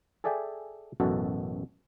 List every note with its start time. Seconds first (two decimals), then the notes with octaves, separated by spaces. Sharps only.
0.24 G#4 A4 D5 E5 G5 G#5
1.00 A1 F#2 B2 F#4 A4